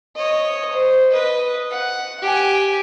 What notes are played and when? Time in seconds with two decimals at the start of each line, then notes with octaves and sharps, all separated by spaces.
0.16 C#5 D#5
0.70 C5
1.11 B4 D#5
1.70 F#5
2.22 G4 G#5